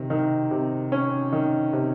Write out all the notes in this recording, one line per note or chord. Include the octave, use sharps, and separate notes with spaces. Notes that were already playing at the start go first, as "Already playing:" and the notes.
Already playing: C3 D#3
D#3
C3
C#4
D#3
C3